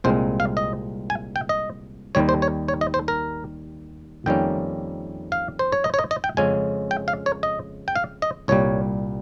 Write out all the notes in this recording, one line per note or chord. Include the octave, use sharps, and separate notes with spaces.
C2 A#2 G#3 C4 C5
F5
D#5
G#5
G5
D#5
D#2 D#3 G3 C#5
C5
C#5
C#5
D#5
C5
A#4
F2 D#3 G3 A#3 C#4 G5
F5
C5
C#5
D#5
C#5
D#5
D#5
G5
F2 C#3 G#3 C#4 G#5
G5
F5
C#5
D#5
G5
F5
D#5
C2 A#2 G3 C#5